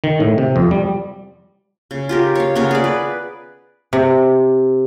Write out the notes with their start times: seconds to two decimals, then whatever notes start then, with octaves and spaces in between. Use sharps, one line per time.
0.04 D#3
0.20 A2
0.38 C3
0.56 F2
0.71 G3
1.91 C#3
2.09 F4 G4 A#4
2.35 C#5 F5
2.55 C#3 B3 A#4 C#5
2.71 G#4 D5
2.84 B4
3.93 C3